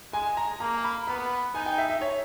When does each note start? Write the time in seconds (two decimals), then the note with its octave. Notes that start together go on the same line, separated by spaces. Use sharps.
0.13 G#3 G#5
0.37 A#5
0.60 A#3 A#5
0.84 B5
1.07 B3 B5
1.55 D#4 G#5
1.66 G5
1.78 E5
1.90 E5
2.01 C#5